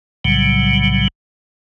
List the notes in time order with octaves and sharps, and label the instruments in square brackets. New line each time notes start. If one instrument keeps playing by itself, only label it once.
[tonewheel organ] B1 A2 C#3 F#3 G3